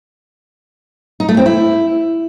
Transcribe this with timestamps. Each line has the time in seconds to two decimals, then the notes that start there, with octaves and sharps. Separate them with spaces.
1.20 D#4
1.29 A3
1.37 C4
1.46 E4